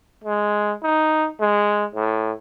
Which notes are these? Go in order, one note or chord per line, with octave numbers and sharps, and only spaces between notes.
G#3
D#4
G#3
A2